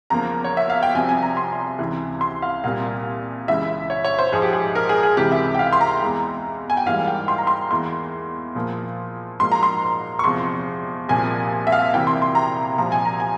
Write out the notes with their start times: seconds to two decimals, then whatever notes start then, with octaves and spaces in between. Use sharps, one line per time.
0.10 E2 C#3 F3 A#3 A#5
0.44 C#5
0.57 E5
0.70 F5
0.83 G5
0.95 C2 C3 F3 G#5
1.09 G#5
1.22 A#5
1.37 C6
1.79 C#2 C3 E3
2.21 C6
2.42 F5
2.64 C2 A#2 G3 A#3 F5
3.48 C#2 C#3 E3 G#3 E5
3.90 C#5
4.04 C#5
4.19 C5
4.32 G#2 F3 G#3 G#4
4.42 G4
4.53 G#4
4.75 A#4
4.89 G#4
5.03 G#4
5.17 C#2 C3 E3 G#3 G4
5.32 E5
5.54 G5
5.59 F5
5.73 C6
5.81 A#5
6.02 E2 E3 G#3
6.70 G#5
6.77 G5
6.86 G#2 E3 G3 A#3 F5
7.08 G5
7.28 C6
7.38 A#5
7.47 C6
7.71 E2 E3 A#3 C6
8.55 A#2 F3 A#3
9.40 G#2 F3 A#3 C6
9.52 A#5
9.63 C6
10.19 C#6
10.24 E2 C3 F3 C6
11.09 C2 A#2 F3 A#3 G#5
11.67 E5
11.72 F5
11.93 C2 C3 E3 A#3 G5
12.07 C6
12.22 C6
12.35 A#5
12.78 C2 A#2 F3 A#5
12.92 G#5
13.05 A#5
13.20 G#5